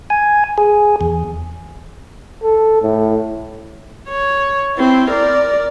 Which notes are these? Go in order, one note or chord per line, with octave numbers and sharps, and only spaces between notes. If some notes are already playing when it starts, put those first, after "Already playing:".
G#5
G#4
E2
A4
A2
C#5
C4 E4
A#4 D5